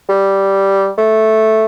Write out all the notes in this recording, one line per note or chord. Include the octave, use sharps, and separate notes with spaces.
G3
A3